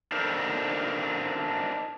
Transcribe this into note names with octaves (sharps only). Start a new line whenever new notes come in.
D4 D#4 A4 A#4 C5